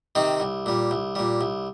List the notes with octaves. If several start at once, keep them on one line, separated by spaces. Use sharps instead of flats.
C3 D#3 C4 D#4
C2
A#2 G3
C2
A#2 G3
C2